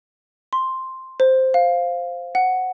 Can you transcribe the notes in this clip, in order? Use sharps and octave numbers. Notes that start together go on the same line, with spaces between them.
C6
C5
F5
F#5